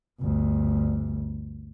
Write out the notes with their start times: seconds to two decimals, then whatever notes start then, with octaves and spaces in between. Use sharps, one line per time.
0.20 G1 D2